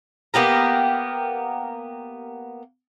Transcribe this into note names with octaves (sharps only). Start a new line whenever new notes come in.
A#3 B3 G4 A#4